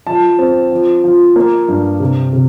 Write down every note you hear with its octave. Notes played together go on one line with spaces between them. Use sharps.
F3 A5
C4
F3
F3
A#3
G2
C3
C3